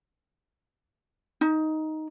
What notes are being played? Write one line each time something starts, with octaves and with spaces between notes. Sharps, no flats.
D#4